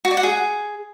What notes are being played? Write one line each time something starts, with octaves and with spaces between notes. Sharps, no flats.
F#4
D5
F#5
G#4